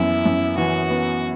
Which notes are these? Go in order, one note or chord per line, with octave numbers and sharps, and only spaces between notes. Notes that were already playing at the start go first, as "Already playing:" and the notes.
Already playing: F#2 E3 B3 E4
F#2
E3 F#4
B3